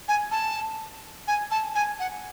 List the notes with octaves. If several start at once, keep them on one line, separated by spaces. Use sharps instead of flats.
G#5
A5
G#5
A5
G#5
F#5